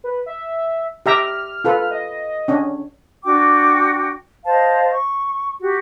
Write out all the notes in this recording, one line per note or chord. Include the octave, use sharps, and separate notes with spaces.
B4
E5
G4 E5 A#5 F6
F4 A4 B4
D#5
C#4 D4
D4 F#4 G5 D6
C5 D#5 F5 A5
C#6
F#4 G4